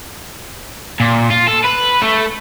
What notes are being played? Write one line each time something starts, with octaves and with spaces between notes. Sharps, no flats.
A#2
F4
A4
B4
A3